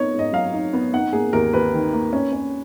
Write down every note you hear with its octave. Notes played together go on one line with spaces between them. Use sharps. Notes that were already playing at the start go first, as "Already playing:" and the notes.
Already playing: B3 D#4 C#5 D#5
G#2
D#5
F#3 F5
D#4
B3
D#4 F#5
A#3 G#4
D#2 A#4
D#2 B4
D#3
A#3
C#4
C#4